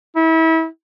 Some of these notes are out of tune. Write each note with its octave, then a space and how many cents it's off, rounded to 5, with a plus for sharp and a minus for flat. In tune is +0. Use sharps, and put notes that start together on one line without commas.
E4 -30